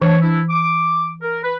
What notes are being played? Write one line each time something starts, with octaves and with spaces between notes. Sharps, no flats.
E3 D4 C#5
D4 E4
D6
A#4
B4